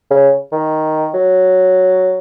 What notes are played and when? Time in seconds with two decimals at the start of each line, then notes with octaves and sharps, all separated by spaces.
0.10 C#3
0.52 D#3
1.14 F#3